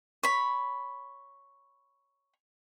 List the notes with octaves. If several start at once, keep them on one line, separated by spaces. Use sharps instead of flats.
C#5 B5